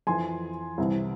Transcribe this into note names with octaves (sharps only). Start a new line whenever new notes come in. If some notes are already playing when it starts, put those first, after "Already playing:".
F2 E3 G#5 C6
C2 C3 E3